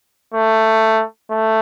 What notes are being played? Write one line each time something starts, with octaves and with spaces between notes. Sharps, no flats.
A3
A3